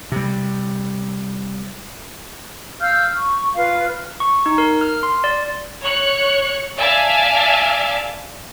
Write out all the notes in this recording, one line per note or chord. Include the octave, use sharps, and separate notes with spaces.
C3 G3
F5 E6 F6 G6
C#6
F4 B4 F5
C#6
D#4
A#4
F6
C6
D5
C#5 F#6 C#7
D5 E5 F5 G#5 A5